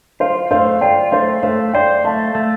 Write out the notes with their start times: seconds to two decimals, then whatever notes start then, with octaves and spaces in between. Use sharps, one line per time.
0.20 F4 C5 F5
0.51 A3 C5 F5
0.81 F4 D5 G5
1.12 A3 C5 F5
1.43 A3 C5 F5
1.73 C5 D5 G5
2.04 A3 F5 A5
2.35 A3